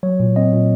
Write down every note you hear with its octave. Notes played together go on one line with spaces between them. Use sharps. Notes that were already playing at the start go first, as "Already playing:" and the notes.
F#3 C#5
A#2
C4 D#5
A#2